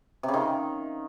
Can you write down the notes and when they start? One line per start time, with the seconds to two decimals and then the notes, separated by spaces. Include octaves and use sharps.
0.23 C3
0.28 C#3
0.34 D#3